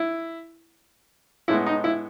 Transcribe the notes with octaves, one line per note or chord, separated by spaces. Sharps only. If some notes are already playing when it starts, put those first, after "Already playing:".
Already playing: E4
A2 G#3 B3 E4
D#4
E4